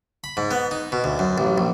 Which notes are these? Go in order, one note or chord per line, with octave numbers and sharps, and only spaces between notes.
B5
G#2
B3
D#4
B2
D2
F#2
A1
A#1